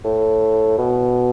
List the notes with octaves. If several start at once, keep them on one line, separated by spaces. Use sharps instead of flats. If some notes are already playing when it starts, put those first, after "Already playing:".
A2
B2